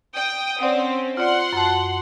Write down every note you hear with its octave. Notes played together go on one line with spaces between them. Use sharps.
G5 D#6
C4 C#4 D5 F#5 D#6
F4 D5 F#5 C6
F#2 A5